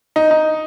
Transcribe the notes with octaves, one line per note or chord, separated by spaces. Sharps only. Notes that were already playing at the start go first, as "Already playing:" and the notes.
D#4
D#4